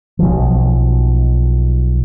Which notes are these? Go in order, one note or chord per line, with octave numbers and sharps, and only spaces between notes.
B1 F3